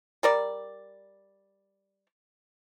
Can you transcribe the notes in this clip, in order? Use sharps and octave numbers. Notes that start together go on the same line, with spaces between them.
G3 A#4 D5